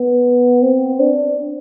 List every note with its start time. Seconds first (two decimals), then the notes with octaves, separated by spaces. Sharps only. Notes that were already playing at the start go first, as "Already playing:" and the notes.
Already playing: B3
0.62 C4
1.00 D4